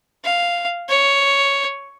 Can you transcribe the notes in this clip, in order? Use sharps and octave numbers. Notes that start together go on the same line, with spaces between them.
F5
C#5